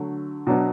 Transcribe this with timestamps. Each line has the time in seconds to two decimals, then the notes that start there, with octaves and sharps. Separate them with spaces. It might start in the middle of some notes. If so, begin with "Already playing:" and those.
Already playing: D3 F#3 A3
0.47 B2 F#3 B3 D4